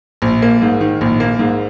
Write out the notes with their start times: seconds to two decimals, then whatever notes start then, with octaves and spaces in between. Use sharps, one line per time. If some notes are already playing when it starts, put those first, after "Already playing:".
0.22 A#1
0.42 A#3
0.62 G#2
0.80 D#3
1.01 A#1
1.20 A#3
1.39 G#2